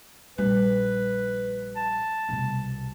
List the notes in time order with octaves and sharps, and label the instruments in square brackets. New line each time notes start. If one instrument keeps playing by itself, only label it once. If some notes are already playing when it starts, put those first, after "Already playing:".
[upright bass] A#1 G3 [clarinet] B4
[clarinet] A5
[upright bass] C2 B2